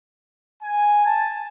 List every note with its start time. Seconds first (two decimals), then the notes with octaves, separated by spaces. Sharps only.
0.63 G#5
1.06 A5